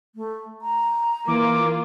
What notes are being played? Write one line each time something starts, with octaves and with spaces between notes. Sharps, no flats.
A3
A#5
E3 A#3 F4 D6